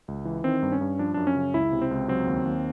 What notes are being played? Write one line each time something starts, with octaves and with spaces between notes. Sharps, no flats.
C#2
E3
D#3 C4
G2
C#4
G2
F3 D4
F#2 D4
C#4
C#3
C#2 E4
C3
C4
C#2
F#3 C4
D#2
D#2